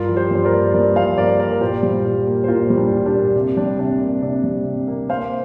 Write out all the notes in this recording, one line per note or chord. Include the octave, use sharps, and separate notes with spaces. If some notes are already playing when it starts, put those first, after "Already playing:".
Already playing: G2 F4 A#4
F3
G4 C5
G2 C5
A#4 D5
A#3
G2 A#4 D5
F3 C5 F5
G2 A#4 D5
A#3 A#4 D5
A#4
A#2 G4 C5
G3
A#2
A#3
C5
A#2 F4 A#4
G3
D4
A#2
D4 G4
A#3
C3
G3 D4
C3 D4
A#3
C3 D4
G3
C3
A#3
A#3 C5 F5